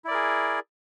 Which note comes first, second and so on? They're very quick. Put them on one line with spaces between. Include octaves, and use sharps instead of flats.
E4 D5 A#4 G#4